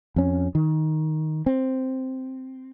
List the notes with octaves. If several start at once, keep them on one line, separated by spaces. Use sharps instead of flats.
F2 C#4
D#3
C4